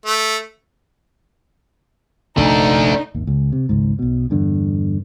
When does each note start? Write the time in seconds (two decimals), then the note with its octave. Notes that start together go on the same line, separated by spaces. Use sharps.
0.06 A3
2.38 F1 A#1 F#2 A3 D4 D#4
3.14 G#1 D#2
3.27 C#2
3.52 C3
3.69 G#1 C#2 G#2
3.99 B1 B2
4.30 E2 G2 D3